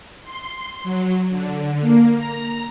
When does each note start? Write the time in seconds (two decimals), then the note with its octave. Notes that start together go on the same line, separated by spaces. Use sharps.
0.24 C6
0.83 F#3
1.30 D3
1.81 A#3
2.16 A#5